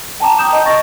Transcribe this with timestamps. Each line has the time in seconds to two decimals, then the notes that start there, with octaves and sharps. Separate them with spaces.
0.20 G5 A5 A#5 D6
0.39 D#6 G6 E7
0.53 D#5
0.65 D#5 C#6 A6 A#6